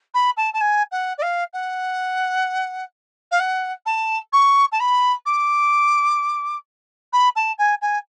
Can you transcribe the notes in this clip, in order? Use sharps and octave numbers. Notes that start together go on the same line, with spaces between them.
B5
A5
A5
G#5
F#5
D5
F5
F#5
F5
F#5
A5
C#6
A5
B5
D6
B5
A5
G#5
G#5